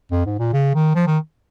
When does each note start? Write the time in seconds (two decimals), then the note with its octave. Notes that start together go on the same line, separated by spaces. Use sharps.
0.11 F2
0.26 G#2
0.39 A#2
0.53 C#3
0.75 D#3
0.95 F3
1.07 D#3